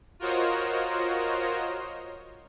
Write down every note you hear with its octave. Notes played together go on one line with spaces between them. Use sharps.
F4 F#4 A#4 C5 C#5 D#5